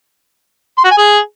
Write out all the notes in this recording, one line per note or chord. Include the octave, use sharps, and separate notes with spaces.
C6
F#4
G#5
G#4